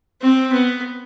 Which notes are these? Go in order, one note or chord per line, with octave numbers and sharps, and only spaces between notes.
C4
B3